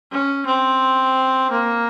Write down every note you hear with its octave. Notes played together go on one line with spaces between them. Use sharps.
C#4
C4
A#3